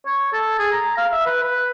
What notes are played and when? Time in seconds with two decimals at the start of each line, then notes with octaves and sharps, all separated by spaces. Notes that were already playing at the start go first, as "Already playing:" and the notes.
0.06 C#5
0.33 A4
0.59 G#4
0.73 A#5
0.98 F5
1.12 E5
1.26 B4
1.43 B4